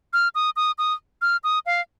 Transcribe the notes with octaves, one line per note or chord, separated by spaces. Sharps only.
F6
D#6
D#6
D#6
F6
D#6
F5